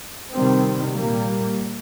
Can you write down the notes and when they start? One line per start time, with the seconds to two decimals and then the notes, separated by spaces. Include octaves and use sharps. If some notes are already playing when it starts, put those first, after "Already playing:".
0.33 C3 D#3 G3 C4
0.95 A#2 G3 A#3